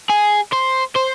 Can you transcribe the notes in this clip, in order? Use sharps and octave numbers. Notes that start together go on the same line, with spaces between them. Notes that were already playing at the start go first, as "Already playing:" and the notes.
G#4
C5
C5